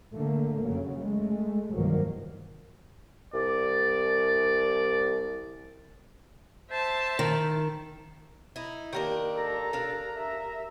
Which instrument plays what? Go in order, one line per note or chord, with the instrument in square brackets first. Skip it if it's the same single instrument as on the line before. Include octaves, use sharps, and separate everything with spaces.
[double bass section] A2 D3 A3 A#3
F#2 C#3 F#3
G#3 A3
C2 G2 D#3 F3 F#3 A#3
[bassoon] C2 [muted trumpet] D5
[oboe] C5 [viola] E5 A5
[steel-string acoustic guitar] D#3
[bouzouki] D#4 E4
[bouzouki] D#3 A#3 D4 [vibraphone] G4 A#4
[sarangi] A4 [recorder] A#5
[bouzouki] D4 F5
[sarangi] E5